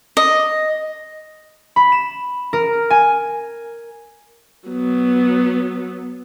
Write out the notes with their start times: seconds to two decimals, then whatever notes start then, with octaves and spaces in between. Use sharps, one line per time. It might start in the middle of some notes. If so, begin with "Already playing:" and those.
0.17 D#5
1.76 B5
1.92 E7
2.53 A#4
2.90 G#5
4.68 F#3 B3